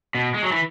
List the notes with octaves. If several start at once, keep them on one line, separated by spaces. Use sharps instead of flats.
B2
G#3
F#3
E3